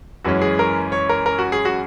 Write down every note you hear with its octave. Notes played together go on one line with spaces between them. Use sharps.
F#2 E3 G#3 C#4 F#4
G#4
A#4
C#5
A#4
A#4
F#4
G#4
F#4